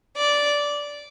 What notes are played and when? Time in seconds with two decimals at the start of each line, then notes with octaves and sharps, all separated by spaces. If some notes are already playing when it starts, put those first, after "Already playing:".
0.16 D5